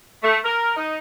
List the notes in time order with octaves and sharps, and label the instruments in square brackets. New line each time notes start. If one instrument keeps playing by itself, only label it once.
[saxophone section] A3
A#4
D#4